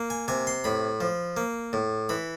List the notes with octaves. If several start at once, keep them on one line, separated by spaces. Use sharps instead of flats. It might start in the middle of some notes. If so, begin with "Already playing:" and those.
Already playing: A#3
G#5
C3 G#5
C6
A2 B5
F3
A#3
A2
E3 B5